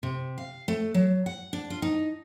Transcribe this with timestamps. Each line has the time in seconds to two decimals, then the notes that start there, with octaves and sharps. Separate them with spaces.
0.03 C3
0.38 F5
0.68 A3
0.94 F#3
1.26 F#5
1.53 D4
1.70 F4
1.82 D#4